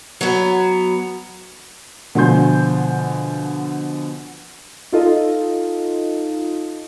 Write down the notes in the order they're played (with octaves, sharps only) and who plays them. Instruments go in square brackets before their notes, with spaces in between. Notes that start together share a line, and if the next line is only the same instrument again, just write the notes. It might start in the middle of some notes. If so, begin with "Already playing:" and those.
[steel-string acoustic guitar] F#3 B3
[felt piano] B2 D3 F3 G#5 C6 G6
[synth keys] D#4 F4 A4 D#5